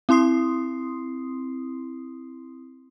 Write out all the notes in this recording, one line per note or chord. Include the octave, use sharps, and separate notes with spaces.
C4 E4 C6 D#6 C7